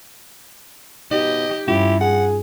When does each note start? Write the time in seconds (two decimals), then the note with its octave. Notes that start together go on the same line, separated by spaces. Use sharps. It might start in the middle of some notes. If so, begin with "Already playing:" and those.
1.11 B2 D#4 G4 D#5
1.68 G2 C#4 E4 F4 G4
2.01 G#4 F#5